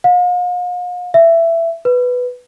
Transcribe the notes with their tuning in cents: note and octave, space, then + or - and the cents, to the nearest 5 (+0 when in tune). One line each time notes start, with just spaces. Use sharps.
F5 +45
E5 +15
B4 +5